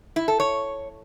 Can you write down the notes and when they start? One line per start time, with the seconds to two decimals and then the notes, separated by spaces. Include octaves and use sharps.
0.16 E4
0.28 A4
0.40 C#5